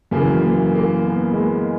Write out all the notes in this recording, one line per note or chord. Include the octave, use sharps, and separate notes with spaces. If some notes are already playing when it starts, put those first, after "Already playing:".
F#2 C#3 E3 A#3
A#3
A#3
B3
G#3
A#3